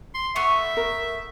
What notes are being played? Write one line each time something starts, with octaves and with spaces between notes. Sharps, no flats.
C6
A3 B3 E5 C#6
A#4